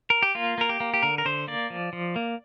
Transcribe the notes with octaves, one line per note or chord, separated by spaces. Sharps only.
A#4
G4
A#3 F4
A#3 A#4
G4
A#3
G4
D3 A#4
A#4
D3 C5
A#3 D5
F3
F3
A#3